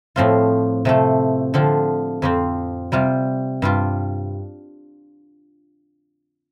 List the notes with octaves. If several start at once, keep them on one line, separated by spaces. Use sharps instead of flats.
A2 F3 C4 F4
C3 F3 A3
D3 F3 C4 F4
F2 F3 C4
C3 G3 F4
G2 G3 F4